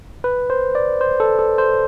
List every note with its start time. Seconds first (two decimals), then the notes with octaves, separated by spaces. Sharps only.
0.24 B4
0.50 C5
0.75 D5
1.01 C5
1.20 A4
1.39 A4
1.58 C5